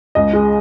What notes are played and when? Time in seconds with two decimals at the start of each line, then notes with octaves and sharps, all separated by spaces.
0.15 C#2 D#5
0.33 G#3